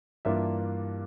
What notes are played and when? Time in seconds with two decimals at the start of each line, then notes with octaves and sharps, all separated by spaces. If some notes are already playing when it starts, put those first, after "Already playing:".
0.25 G2 E3 A#3 D4 F4 E5